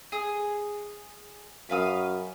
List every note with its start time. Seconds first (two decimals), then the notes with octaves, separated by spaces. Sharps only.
0.12 G#4
1.70 F#2 B4 F5 D#6